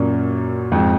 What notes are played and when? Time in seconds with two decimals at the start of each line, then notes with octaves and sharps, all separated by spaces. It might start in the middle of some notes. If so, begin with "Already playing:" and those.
Already playing: F#2 A#2
0.72 F2 G#2